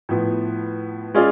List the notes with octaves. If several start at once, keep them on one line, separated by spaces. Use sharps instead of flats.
A2 F3 B3
G#3 C#4 F4 G#4 D5